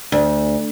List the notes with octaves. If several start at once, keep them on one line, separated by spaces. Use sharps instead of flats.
D2